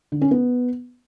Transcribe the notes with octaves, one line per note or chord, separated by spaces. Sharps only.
D3
C#4
B3